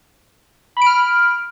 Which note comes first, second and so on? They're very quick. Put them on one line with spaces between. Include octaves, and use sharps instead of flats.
B5 D7 F6